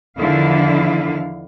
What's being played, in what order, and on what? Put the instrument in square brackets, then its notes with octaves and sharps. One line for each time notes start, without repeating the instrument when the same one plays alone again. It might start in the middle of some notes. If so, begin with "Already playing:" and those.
[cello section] E2 D3 D#3 F3 E4 F5